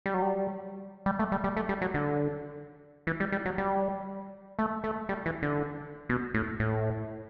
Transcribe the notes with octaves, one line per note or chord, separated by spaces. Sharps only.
G3
F#3
G3
G3
A3
G3
G3
A3
G3
F#3
D3
E3
G3
G3
F#3
G3
A3
A3
G3
E3
D3
B2
A2
A2